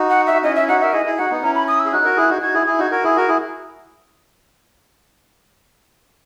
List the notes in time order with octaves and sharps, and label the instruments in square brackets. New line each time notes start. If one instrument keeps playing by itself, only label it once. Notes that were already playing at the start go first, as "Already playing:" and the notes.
Already playing: [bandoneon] D#4 F#4
[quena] F#5
E5
[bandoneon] F#4
[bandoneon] C#4 E4 [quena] D#5
[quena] E5
[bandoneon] E4
[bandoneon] D#4 F#4 [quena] F#5
[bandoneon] A#4 [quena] E5
[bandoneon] E4 G#4 [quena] D#5
[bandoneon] E4 G#4
[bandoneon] D#4 F#4 [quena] F#5
[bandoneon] B3 D#4
[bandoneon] C#4 E4 [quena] A#5
[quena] B5
D#6
E6
[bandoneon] G#4
[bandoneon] D#4 F#4 [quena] F#6
[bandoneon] F#4 A#4
E4 G#4
D#4 F#4
[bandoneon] D#4 F#4 [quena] G#6
[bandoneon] E4 G#4
E4 G#4
D#4 F#4
F#4 A#4
E4 G#4
F#4 A#4
E4 G#4